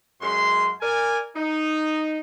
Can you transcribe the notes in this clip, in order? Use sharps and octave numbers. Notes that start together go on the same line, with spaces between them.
F#2 G#3 C#4 C6
A#4 D5 G#5
D#4